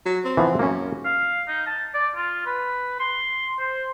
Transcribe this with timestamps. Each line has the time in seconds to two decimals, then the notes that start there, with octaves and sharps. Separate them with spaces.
0.05 F#3
0.25 C4
0.37 E3 F3 B3
0.59 F#2 A#3 C#4
1.05 F5
1.48 D#4
1.67 A5
1.94 D5
2.16 F4
2.46 B4
3.00 C6
3.59 C5